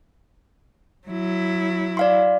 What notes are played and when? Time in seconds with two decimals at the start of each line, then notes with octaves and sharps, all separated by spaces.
1.08 F#3 E4
1.97 D5 F5 C6